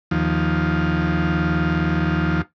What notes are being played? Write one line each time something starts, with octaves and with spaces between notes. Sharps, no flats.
D#2 F3